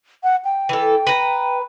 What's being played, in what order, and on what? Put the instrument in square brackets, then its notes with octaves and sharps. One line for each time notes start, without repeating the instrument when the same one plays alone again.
[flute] F#5
G5
[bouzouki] E3 A4
B4 A#5